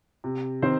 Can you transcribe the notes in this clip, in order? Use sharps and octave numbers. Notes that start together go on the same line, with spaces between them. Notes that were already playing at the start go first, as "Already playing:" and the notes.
C3
D#3 C4 C5